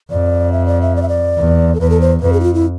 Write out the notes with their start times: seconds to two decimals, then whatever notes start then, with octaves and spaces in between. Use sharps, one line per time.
0.10 F2 D5
0.52 E5
0.66 D5
0.81 E5
0.96 D5
1.02 E5
1.09 D5
1.38 E2
1.75 A4
1.80 E2 B4
1.90 A4
2.01 C5
2.22 F2 B4
2.33 G#4
2.40 E4
2.43 F4
2.54 E4